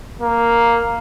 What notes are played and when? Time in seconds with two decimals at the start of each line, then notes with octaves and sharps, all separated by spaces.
0.21 A#3